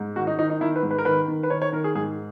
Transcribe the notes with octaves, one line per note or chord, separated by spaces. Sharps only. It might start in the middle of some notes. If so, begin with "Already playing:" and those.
Already playing: G#2
D#3 F#4
D#4
D#3 D#4
D#4
D#3 E4
B4
G#2
B4
A#4
D#3 B4
D#3
B4
D#3 C#5
C#5
D#3 A#4
G#4
G#2 G#4